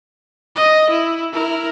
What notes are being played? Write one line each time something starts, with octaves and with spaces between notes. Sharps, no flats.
D#5
E4
E4 A#4